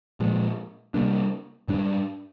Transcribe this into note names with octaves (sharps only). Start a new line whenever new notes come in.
A#2 F3 G#3
C3 G3 A#3 D4
G#2 G3 D4